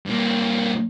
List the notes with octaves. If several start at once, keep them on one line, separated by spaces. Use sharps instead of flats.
G2 A#3